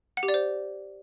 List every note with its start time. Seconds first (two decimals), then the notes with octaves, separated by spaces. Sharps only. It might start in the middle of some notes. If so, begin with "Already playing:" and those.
0.17 F#5
0.23 G4
0.28 D5
0.34 C5